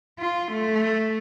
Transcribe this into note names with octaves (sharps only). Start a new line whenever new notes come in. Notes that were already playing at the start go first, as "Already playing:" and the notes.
F4
A3